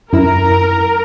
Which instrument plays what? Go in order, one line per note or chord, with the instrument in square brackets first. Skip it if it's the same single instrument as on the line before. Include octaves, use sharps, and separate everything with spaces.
[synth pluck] F#2 E4 E6 [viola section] A#4